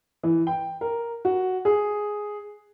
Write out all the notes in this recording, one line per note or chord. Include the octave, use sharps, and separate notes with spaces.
E3
G5
A#4
F#4
G#4